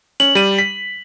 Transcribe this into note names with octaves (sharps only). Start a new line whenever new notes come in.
C#4 F#7
G3 D#7
B6